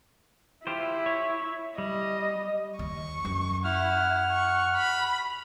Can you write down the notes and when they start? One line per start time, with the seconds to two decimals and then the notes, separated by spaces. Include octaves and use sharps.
0.67 E4 F4 G4 C5
1.06 C#5
1.78 G3 D#5
2.79 D#2 C#6
3.25 F#2
3.64 E4 F#5 F6
4.32 C#6
4.76 B5